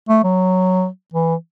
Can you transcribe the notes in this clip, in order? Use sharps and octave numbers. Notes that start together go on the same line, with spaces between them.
A3
F#3
E3